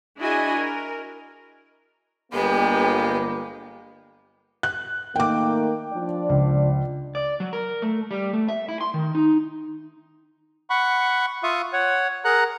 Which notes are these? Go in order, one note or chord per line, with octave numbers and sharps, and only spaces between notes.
D4 E4 F#4 G#4 D#5 G#5
A#4
G1 G#3 A#3 B3 G4
F#6
D#3 A3 A#3 G5 D6
F3 D4 D5
C#2
D5
F#3
A#4
A3
G3
A3
E5
E4
C6
D#3
D#4
F#5 B5 C#6
F4 E5 F5 C#6 D#6
C#5 F#5
G#4 A#4 F#5 A#5 F#6